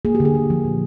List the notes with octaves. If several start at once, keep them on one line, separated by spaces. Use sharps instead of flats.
A#3 G#4
G4
D3
G#4
D3
F3
A#2